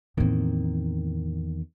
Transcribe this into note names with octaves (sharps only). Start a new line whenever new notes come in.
E2 A2 D#3 A#3 C4